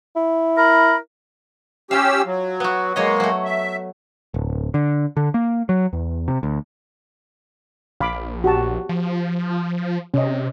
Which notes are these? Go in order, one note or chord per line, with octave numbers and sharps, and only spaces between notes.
E4
A#4 B5
C#4 F4 G4 F5 E6
F#3
B3 F#4
F#3 G#3 A#3 C#5 D#5
F#3 A3
E5
D1
D3
D3
A#3
F#3
E2
C3
D2
A#1 F5 B5 D6
F#4 G4 A5
F3
C3 C#4 D#5